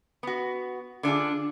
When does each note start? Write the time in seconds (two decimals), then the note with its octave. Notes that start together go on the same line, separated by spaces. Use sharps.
0.23 B3 F#4
1.03 D3 D4 F4 G#4